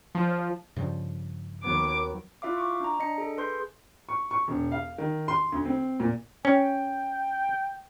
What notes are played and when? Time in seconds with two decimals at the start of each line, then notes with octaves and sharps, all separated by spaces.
0.15 F3
0.76 G2 C#3 F3
1.64 D#2 F#3 B3 D6
2.42 E4 F4 E5 F5 D6
2.57 C#6 D6
2.80 D4 A#5
2.99 D4 D#5 C#7
3.18 G#4 A4
3.37 G#4 B4 C6 G6
4.09 C#6
4.31 C#6
4.48 E1
4.72 F5
4.98 D#3
5.28 C6
5.52 D2
5.65 C4
6.00 A#2
6.45 C#4 G5